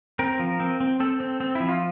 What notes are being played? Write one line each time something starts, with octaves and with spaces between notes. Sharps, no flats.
C4 A#4
F3
C4
C4
C4 A4
C4
C4
F3 E4
F4